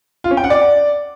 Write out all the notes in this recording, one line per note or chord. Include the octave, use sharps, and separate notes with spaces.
F4
C#4
G5
F#5
D5